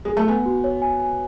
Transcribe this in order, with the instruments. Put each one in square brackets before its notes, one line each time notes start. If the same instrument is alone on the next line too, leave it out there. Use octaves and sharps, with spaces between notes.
[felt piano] G#3
A3
[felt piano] B3 [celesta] G#5
[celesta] F#4
C#5
G#5
G#5